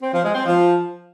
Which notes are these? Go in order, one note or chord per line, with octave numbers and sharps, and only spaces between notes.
C4
F3
G#3
C4
F3